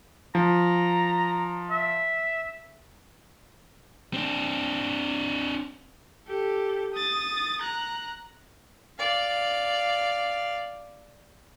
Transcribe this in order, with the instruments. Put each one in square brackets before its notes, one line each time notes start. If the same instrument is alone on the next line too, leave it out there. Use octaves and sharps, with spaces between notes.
[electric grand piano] F3 [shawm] A#5
[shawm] E5
[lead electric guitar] C4 D4
[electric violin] G4 A4
D#6 A6
A#5 F#6
[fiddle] D5 F5